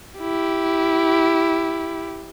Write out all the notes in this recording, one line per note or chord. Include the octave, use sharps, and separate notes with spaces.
E4 G4